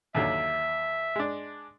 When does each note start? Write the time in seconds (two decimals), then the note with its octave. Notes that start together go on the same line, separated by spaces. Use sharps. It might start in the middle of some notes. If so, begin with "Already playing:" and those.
0.15 D#2 D3 F#3 E5
1.16 G#3 D4